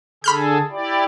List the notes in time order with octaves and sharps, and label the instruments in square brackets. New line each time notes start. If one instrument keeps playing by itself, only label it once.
[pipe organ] D3 G#4 A4 [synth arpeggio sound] B5 F6 G6
[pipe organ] E4 G4 D5